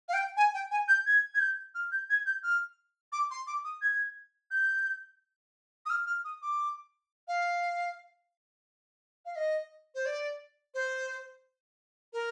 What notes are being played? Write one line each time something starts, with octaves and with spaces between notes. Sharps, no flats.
F5
G5
G#5
G5
G#5
G6
G#6
G#6
G6
F6
G6
G#6
G6
F6
D6
C6
D6
D#6
G#6
G6
D#6
F6
F6
D#6
D6
F5
F5
D#5
C5
D5
C5
A#4